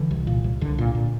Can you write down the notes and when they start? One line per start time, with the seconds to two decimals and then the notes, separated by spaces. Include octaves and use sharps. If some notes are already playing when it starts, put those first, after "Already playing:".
Already playing: D3 E3
0.11 C2
0.27 A#2
0.44 C2
0.61 C2 D3
0.78 A#2
0.95 A#2